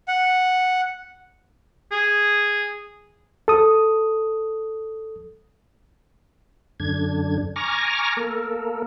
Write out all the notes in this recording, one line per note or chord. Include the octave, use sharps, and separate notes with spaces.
F#5
G#4
A4 D#6
F#2 D3 D4 G#6
G#5 A#5 C#6 D6 F6 A#6
A#3 A4 A#4